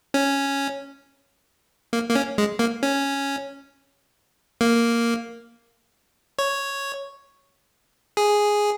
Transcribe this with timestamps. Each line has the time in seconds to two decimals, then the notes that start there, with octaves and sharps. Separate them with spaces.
0.14 C#4
1.93 A#3
2.10 A#3
2.15 C#4
2.38 G#3
2.59 A#3
2.83 C#4
4.61 A#3
6.39 C#5
8.17 G#4